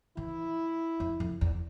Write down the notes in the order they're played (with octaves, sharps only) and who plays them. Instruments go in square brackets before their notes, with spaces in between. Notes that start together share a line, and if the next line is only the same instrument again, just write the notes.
[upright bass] E3 [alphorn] E4
[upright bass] F2
F2
E2